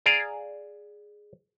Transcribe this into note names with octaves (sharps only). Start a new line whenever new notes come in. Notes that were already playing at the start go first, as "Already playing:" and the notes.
G#4 D5 F5 A#5